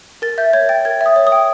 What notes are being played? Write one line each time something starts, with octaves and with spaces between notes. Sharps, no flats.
A#4 A6
E5 G6
C#5 G#6
G5 A6
A#4 G#6
E5 D#6
C#5
D#6
G5